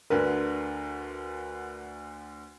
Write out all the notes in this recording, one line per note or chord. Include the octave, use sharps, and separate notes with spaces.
D2 D3 A#4 B4